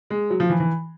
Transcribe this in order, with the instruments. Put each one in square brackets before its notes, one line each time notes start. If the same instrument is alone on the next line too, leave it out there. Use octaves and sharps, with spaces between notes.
[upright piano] G#3
F#3
F3
E3
E3